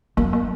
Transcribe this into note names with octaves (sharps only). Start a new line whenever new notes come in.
F#2 A#3
A#3